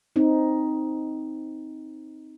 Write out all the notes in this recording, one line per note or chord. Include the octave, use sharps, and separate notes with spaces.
C4 D#4